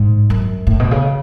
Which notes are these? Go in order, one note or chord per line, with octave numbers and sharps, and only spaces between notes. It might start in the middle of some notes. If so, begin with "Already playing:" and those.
Already playing: G#2
F#2
A2
B2
C#3